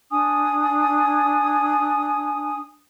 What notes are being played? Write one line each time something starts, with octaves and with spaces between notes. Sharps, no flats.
D4 G#5 D#6